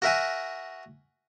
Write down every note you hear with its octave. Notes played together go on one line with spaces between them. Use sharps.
F#4 A#4 E5 F#5 G#5